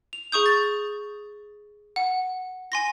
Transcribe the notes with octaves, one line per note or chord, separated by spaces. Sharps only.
F7
G#4 C#6 D#6 G6
A6
F#5
G#5 C6 A#6